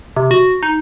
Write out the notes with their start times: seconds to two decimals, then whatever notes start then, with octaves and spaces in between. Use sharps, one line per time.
0.16 C3
0.31 F#4
0.63 D#4